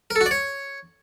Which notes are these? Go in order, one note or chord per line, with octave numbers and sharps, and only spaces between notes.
A#4
A4
F#4
D5
C#5